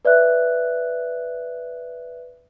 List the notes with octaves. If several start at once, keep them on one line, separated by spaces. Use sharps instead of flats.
B4 D5 E5 F#6